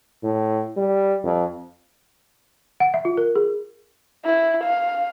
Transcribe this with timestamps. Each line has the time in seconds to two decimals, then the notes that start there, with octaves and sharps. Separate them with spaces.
0.24 A2
0.77 G3
1.24 F2
2.80 F#5
2.94 E5
3.05 F4
3.17 A#4
3.36 G#4
4.25 E4
4.64 F5